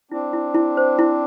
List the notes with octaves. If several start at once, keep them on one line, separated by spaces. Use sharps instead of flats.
C4 D4 E4
E4
E4
C5
E4